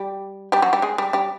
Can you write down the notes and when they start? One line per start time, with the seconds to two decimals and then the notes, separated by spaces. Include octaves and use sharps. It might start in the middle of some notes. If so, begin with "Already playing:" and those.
Already playing: G3 G4
0.52 G3 G4
0.62 F#3 F#4
0.73 G3 G4
0.82 G#3 G#4
0.98 G3 G4
1.13 G3 G4